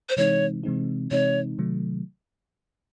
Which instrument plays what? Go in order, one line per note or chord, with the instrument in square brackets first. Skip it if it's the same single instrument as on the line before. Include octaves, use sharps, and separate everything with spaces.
[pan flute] C5
[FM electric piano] C3 E3 G#3 C4 D#4 [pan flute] C#5
[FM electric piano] C3 E3 G#3 C4 D#4
[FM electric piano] C3 E3 G#3 C4 D#4 [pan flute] C#5
[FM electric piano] C3 D#3 F#3 A3